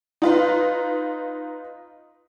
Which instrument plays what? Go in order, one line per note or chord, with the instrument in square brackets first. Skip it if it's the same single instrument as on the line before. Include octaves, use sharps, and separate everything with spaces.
[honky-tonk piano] D#4 F4 B4